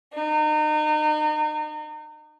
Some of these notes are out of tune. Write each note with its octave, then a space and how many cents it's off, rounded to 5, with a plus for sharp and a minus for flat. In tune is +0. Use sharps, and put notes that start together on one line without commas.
D#4 -35